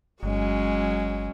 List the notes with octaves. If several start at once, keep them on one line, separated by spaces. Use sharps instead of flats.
G1 F#3 G#3 C#4